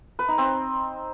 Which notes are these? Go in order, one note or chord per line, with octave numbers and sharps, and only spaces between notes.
B4
D#4
C4